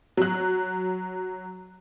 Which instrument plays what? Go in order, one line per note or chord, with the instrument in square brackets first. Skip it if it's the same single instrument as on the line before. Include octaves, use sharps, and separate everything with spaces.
[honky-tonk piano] F#3 F#6